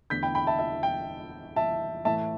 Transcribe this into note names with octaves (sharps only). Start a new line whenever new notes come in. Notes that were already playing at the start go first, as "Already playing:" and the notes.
E2 D3 A3 G6 B6
G5 B5
G5 B5
E5 A5
E5
G5
E5 A5
A2 E3 A3 E4 E5 A5